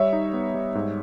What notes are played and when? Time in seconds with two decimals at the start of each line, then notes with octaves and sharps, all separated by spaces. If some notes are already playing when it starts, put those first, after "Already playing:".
Already playing: G3 C#5 E5
0.13 D#4
0.33 B3
0.54 G3
0.75 G#2